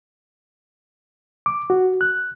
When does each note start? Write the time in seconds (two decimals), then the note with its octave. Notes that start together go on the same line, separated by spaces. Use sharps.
1.46 D6
1.70 F#4
2.01 F#6